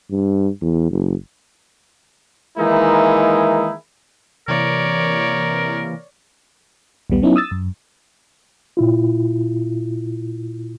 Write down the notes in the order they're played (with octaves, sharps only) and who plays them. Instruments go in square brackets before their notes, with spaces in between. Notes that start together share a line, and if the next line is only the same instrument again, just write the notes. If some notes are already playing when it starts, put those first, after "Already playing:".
[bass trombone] G2
E2
F#1
[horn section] D#3 E3 G#3 A#3 D#4 E4
[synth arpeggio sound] C3 E3 A#3 [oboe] A#4 [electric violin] C#5 D5
[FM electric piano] A#1 D#2 G3 B3
F#3 B3 C#4 D#4 E4
D#6 E6 A6
F#2
[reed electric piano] A#2 E4 F4